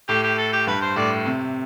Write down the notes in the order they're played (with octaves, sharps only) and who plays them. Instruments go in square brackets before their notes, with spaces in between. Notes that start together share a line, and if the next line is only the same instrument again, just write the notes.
[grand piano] A2 [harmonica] G4
[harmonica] G4
A4
G4
[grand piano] G2 [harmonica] B4
[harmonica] C5
[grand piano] A2 [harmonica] D5
[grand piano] C3